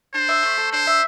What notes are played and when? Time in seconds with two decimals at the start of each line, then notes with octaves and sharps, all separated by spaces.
0.14 D4 C5
0.29 E5
0.43 A3
0.58 A4
0.72 D4 C5
0.87 E5